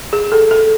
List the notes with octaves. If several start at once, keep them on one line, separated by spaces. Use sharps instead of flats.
G#4
A4
A4